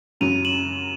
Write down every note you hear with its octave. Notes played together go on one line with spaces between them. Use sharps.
F#2 C#3 F#3 D#7 F7
E7 F#7